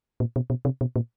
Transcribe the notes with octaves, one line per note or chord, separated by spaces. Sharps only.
A#2
B2
B2
C3
B2
A#2